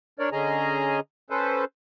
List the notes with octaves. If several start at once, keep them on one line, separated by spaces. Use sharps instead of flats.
D4 A#4 C#5 D5
D3 C#4 G#4 D#5 G#5 A#5
C#4 A4 B4 C5